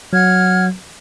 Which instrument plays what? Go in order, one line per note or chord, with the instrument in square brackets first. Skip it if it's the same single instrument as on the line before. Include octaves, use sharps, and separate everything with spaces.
[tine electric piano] F#3 [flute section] F#5 F6 G#6